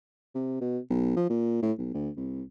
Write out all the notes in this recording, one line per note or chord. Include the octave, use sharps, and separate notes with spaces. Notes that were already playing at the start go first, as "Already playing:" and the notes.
C3
B2
B1
F3
A#2
A2
B1
D2
C2